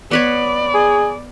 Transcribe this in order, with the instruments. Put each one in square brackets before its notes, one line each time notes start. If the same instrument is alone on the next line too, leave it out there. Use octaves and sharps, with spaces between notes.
[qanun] B3 B4 C#5 [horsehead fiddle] D5
[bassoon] G#4